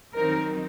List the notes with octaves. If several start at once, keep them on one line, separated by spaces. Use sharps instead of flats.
D#3 F#3 C4 D#4 A#4